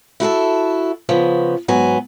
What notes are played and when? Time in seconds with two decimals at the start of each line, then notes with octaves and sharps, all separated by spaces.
0.20 E4 F#4 G#4 A4
1.09 C#3 F3 B3
1.68 G#2 F#3 B3 G#5